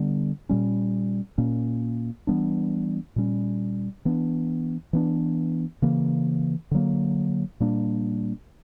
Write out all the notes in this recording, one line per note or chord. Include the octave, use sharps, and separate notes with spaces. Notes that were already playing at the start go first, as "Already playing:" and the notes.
Already playing: D3 G3 B3 D4
A#2 G3 C#4
A#2 A#3 C#4
E3 G3 B3 D4
A#2 G3 C#4
E3 B3 D4
E3 B3 D4
C#3 E3 A#3
D3 F#3 A#3
A#2 G3 A#3 D4